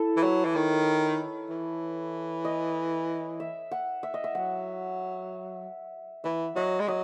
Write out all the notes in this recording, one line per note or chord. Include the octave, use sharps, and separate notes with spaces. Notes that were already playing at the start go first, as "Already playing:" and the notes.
Already playing: E4 A4
E3
F#3 B4
E3
D#3 C#5
E3
D#5
E5
F#5
E5
D#5
E5
F#3 F#5
E3 E5
F#3 D#5
G#3
F#3 D#5